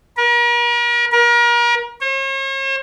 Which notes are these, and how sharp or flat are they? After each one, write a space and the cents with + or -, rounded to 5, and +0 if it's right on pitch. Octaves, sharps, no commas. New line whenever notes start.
A#4 +40
A#4 +35
C#5 -45